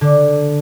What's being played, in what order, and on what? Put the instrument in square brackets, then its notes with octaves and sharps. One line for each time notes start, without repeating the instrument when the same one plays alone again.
[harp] D3